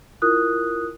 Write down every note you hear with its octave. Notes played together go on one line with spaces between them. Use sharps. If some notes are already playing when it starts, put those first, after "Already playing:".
E4 F4 A#4 D#6 F#6